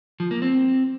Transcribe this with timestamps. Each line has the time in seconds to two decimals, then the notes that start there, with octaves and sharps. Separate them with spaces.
0.20 F3
0.31 A#3
0.42 C4